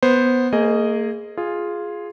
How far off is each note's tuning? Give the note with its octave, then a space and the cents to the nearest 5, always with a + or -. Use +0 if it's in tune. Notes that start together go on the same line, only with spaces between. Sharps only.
B3 +0 C5 +0
A#3 -35 G#4 +0 D#5 +0
F4 +0 G#4 +0